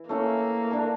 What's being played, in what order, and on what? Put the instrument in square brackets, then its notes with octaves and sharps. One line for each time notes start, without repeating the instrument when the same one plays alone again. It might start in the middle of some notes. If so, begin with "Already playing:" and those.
Already playing: [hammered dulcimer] E3
[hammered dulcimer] A3 C#4 E4 [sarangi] A#3
[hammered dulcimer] A3 D4 A4